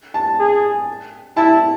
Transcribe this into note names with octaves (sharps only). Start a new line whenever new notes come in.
A5
G#4
E4 A5